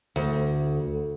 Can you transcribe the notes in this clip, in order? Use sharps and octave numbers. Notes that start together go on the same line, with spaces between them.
D2